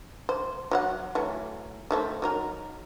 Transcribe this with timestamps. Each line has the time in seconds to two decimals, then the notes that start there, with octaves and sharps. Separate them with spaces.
0.29 C5
0.71 F#3 F4 F#5
1.15 E3 F#3 A3
1.91 D#3 A3 C4
2.22 F#3 D#4 A#4